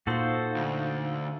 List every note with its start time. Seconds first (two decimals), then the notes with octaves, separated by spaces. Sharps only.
0.07 A#2 D#4 F#4 A4 C5 F5
0.56 D2